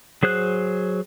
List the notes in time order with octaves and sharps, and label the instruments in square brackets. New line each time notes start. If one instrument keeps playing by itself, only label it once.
[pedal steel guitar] F#3 G#4 C5 F#6